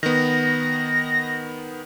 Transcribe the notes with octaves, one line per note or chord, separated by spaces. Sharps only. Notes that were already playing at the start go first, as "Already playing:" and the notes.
D#3 B3 A#6